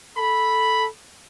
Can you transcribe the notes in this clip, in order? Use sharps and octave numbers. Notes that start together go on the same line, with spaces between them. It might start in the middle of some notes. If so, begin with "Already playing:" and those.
A4 B5